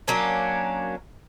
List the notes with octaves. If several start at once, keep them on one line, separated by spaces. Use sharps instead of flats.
F#3 A#3 C#4 D4